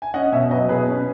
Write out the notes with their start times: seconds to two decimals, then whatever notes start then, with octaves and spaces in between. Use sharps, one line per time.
0.02 G#5
0.14 C#4 D#5 F#5
0.32 B2 C#5 E5
0.51 F#3 B4 D#5
0.69 B2 G#4 B4
0.88 C#4